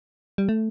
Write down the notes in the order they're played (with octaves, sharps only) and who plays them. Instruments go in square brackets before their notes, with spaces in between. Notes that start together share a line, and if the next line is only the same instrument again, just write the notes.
[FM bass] G3
A3